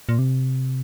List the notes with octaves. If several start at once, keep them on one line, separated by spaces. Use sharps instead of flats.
A#2
C3